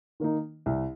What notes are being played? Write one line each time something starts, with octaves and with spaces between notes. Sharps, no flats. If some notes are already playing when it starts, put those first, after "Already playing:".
D#3 A#3 D#4
C2